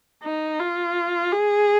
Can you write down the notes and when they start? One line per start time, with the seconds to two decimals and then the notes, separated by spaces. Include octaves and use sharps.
0.24 D#4
0.60 F4
1.32 G#4